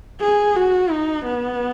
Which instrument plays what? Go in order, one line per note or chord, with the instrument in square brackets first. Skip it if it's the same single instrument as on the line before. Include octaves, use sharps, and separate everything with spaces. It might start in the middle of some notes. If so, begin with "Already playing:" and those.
[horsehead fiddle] G#4
F#4
D#4
B3